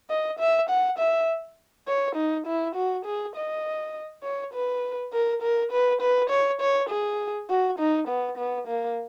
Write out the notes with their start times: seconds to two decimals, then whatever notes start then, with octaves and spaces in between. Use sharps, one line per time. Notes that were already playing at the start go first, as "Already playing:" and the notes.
0.10 D#5
0.39 E5
0.70 F#5
0.99 E5
1.88 C#5
2.16 D#4
2.47 E4
2.76 F#4
3.06 G#4
3.36 D#5
4.23 C#5
4.54 B4
5.13 A#4
5.42 A#4
5.72 B4
6.02 B4
6.30 C#5
6.61 C#5
6.90 G#4
7.50 F#4
7.79 D#4
8.08 B3
8.38 B3
8.68 A#3